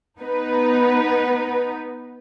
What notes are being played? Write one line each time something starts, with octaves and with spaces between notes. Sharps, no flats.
B3 D#4 B4